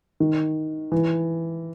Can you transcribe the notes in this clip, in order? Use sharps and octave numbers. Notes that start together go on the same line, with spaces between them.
D#3
E3